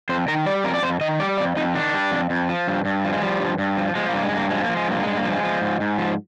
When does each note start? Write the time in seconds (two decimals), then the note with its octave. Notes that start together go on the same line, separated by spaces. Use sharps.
0.09 F2 C5
0.28 D#3 A#4
0.46 G3 D5
0.64 F2 A#4
0.74 D5
0.83 F2 C5
1.01 D#3 D#5
1.20 G3 D5
1.38 F2 D5
1.56 F2 D#4
1.74 D#3 D4
1.94 G3
2.11 F2
2.30 F2
2.49 F3
2.68 G2
2.85 G2
3.04 F3
3.13 G#3
3.22 F3 G3
3.40 G2
3.58 G2
3.77 F3
3.95 F3 G#3
4.09 G2 A#3
4.23 G#3
4.32 G2 A#3
4.50 F3 G#3
4.64 A#3
4.69 F3
4.77 G#3
4.88 G2 A#3
5.03 G2 G#3
5.17 A#3
5.24 F3
5.32 G#3
5.43 F3
5.62 G#2
5.80 G#2
5.98 F3